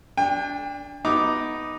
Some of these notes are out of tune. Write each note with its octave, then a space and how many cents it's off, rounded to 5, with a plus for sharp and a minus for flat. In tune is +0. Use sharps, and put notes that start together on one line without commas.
D4 -15 G5 +40
B3 +0 D#4 +0 D6 +0